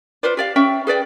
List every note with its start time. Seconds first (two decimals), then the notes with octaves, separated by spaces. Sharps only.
0.23 F4 B4 C5 D5
0.37 G4 D5 F5
0.56 C#4 E5 G5
0.87 G#4 B4 D5 G5